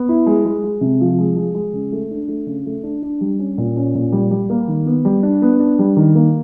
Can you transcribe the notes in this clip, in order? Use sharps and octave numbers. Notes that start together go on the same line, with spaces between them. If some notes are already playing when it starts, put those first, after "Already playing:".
Already playing: B3
E4
G#3
G#3
G#3
C3
F3
G#3
G#3
G#3
C#3
A3
D4
A3
C#3
A3
D4
D4
G3
C#4
A#2
C#4
A#2
G3
G3
A#3
D#3
B3
G3
D4
B3
D4
G3
D#3
A#3